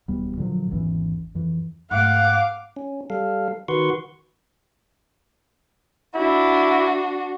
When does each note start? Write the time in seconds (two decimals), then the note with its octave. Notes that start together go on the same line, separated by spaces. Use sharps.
0.08 E1 D#2 G3 B3
0.37 A#2 D3 F3 F#3
0.70 G#1 E2 E3 C#4
1.35 F2 E3
1.91 G#2 A3 F5 F#5 D6
2.76 C#4
3.10 G3 A4 F5
3.68 D#3 F#4 B4 C6 C#6
6.15 D4 E4 F#4